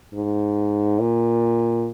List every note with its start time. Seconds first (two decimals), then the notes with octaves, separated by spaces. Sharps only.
0.14 G#2
1.00 A#2